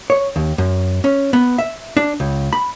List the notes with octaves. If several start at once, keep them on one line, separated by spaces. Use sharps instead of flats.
C#5
D#2
F#2
C#4
B3
E5
D4
C#2
B5